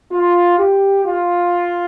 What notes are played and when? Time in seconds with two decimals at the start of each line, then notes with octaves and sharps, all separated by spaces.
0.12 F4
0.59 G4
1.04 F4